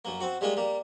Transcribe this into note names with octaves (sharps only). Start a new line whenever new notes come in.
F#2 A#3
C4 F#4
G3 G#3 A#3 F4
G3 A#3